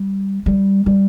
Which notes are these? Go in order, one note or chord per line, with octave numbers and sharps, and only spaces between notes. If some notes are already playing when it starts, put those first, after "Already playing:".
Already playing: G3
G3
G3